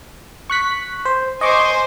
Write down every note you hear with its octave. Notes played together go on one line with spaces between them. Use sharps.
C#6 F#6 B6
C5
C5 D#5 G#5 C#6 D6